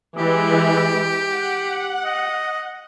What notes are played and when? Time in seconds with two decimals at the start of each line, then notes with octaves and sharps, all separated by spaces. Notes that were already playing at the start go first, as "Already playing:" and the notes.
0.17 E3 G#3 G4
1.34 F#5
2.05 D#5